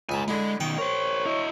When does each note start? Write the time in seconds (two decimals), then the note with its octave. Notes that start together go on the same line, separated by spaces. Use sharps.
0.09 C#2 E5 G#5 A#5
0.28 D3 G#3 E4
0.60 B2 D#3 G5
0.78 A#4 C5 C#5
1.26 E4 D#5